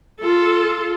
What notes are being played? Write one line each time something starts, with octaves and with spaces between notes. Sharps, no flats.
F4 A4